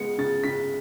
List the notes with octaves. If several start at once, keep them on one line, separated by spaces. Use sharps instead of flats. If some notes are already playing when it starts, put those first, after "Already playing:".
Already playing: C#3 G#3 B3 C#7
C#3 A6
C#3 B6